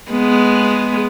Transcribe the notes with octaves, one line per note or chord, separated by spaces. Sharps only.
G#3 B3